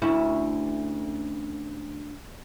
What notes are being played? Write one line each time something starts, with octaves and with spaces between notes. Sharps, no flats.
D2 C#4 E4